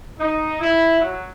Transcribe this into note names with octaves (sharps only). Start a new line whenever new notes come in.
D#4
E4
F#3